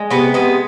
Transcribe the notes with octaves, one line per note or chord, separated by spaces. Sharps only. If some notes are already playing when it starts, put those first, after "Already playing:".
Already playing: G#3
C3 B3
G#3 B3